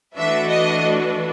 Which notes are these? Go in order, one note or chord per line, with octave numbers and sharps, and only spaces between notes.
E3 A3 D4 F#4 B4 E5
D#5